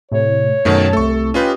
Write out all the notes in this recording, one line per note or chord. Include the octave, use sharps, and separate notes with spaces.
A2 C3 C#5
F#2 B2 D#3 F#3 A3 A5
C2 A3 A4 C#6
C#4 F4 G4 B4 D#5